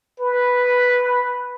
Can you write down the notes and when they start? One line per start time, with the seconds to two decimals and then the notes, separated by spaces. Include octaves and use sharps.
0.20 B4